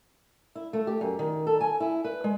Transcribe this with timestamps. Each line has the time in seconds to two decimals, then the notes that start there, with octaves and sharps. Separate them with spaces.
0.55 E4
0.73 A3
0.87 G4
1.01 F#2
1.19 D#3
1.47 A4
1.61 G#5
1.80 E4
2.04 B4
2.24 G#3